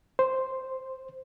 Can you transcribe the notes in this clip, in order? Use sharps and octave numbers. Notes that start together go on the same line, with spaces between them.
C5